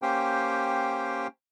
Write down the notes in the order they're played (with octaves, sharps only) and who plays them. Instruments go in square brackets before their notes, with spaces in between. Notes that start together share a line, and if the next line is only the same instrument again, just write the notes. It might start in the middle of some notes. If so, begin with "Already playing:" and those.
[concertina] A#3 C#4 G4 C5 G5